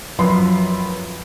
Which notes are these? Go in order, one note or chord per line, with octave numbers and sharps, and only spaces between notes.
F#2 F3 F#3 B4 B5 C6